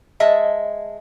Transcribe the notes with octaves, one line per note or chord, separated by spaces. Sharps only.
G#3 D#5 E5 A5